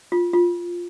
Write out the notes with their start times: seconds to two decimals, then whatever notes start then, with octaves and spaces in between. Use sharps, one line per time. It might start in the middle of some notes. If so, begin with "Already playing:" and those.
0.12 F4
0.33 F4